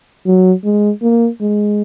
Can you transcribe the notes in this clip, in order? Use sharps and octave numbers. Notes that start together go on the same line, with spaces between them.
F#3
G#3
A#3
G#3